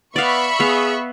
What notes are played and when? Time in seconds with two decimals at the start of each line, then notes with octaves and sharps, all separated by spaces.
0.16 B3 D5 E5 F5 B5 C#6
0.60 B3 G#4 F5